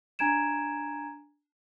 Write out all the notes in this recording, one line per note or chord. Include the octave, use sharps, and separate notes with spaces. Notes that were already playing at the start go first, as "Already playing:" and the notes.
D4 G#5 A#5 G#6 D7 E7